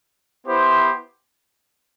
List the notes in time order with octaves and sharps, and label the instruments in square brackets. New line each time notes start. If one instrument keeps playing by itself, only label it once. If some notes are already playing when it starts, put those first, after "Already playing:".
[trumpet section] B3 E4 G4 C5